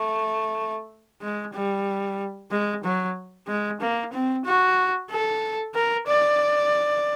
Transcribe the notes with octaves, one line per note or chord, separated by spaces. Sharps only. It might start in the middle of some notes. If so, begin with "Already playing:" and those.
Already playing: A3
G#3
G3
G#3
F#3
G#3
A#3
C4
F#4
A4
A#4
D5